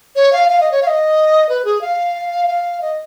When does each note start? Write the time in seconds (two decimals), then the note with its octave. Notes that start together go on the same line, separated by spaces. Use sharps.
0.16 C#5
0.33 F5
0.49 F5
0.60 D#5
0.72 C#5
0.82 F5
0.87 D#5
1.49 B4
1.65 G#4
1.81 F5
2.47 F5
2.81 D#5